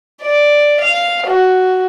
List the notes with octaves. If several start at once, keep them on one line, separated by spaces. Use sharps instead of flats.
D5
F5
F#4